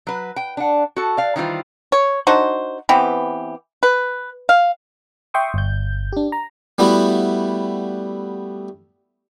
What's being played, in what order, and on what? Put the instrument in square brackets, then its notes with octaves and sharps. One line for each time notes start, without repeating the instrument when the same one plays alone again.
[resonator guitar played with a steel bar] F#3 B4
G5
D4 F#5
F#4 A4
D5 F5
D#3 E3 G3 F4 C5
[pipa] C#5
D4 D#4 F#4 C5
E3 B3 C4 G4
B4
F5
[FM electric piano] E5 G5 C6 C#6 D#6
G1 G6
D4 G4
A#5
[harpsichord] G3 A3 B3 E4 F#4